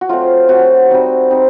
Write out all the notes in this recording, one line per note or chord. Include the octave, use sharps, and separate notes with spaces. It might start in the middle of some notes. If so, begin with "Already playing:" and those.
F#4
F#3 A3 C4 F4
F#3 A3 C4 F#4
G3 C4 D#4
G3 C4 D#4